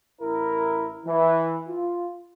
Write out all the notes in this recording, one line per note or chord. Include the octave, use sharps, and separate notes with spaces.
A1 E4 A#4
E3
F4